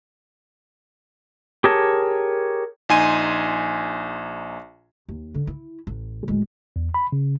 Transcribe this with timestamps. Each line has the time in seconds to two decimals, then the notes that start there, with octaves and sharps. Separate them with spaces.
1.64 G4 G#4 A#4 C#5 A5
2.89 A#1 D#4 G#5 C6 D#7
5.09 D#2
5.34 D3 D4
5.47 E4
5.87 A1
6.28 D1 G#3
6.76 E2
6.94 B5
7.12 C#3